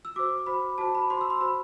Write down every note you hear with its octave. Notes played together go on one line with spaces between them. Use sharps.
E6
F#4 C5 D6
F#4 C5 B5
F#4 C5 A5
B5
F#4 C5 C6
E6
C6
F#4 C5 B5